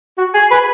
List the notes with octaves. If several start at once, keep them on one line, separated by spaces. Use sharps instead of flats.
F#4
G#4
B4